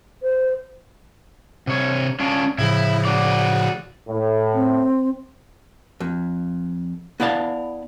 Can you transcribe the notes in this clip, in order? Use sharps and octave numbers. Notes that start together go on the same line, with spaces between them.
C5
C3 C#5
C#4 D4 F4
A2 C#3 F3 E4
F#4 D5
A2
C4
F2
B3 E4 D5 F5 A5